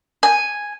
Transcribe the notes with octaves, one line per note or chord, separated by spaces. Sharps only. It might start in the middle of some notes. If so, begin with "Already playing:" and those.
G#5